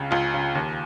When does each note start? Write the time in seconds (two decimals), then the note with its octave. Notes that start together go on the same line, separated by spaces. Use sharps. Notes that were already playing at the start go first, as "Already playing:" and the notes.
Already playing: C#2 C#3
0.11 C#2 F4
0.34 C#3
0.55 D#2